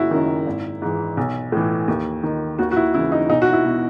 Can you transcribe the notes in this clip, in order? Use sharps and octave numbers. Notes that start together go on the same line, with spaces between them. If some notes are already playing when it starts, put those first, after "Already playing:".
Already playing: F#1 E4 F#4
F#2 D#3
G#1
G#2 E3
B1
A2 E3
D#2
D#3
D#2 F#4
F#4
E4
C#3 E3 E4
D#4
B1 D#4
F#4
E4
B2